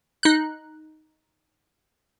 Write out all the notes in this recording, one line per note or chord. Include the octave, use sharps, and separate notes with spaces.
D#4 F#6